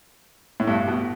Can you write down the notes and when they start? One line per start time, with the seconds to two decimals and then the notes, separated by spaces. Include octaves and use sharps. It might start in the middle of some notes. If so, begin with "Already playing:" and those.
0.60 A2
0.68 G2
0.87 B2